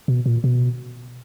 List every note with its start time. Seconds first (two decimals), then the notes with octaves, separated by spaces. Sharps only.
0.08 B2
0.26 A#2
0.44 B2